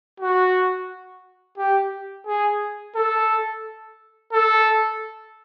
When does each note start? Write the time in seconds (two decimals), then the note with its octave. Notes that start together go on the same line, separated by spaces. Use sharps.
0.20 F#4
1.58 G4
2.27 G#4
2.95 A4
4.33 A4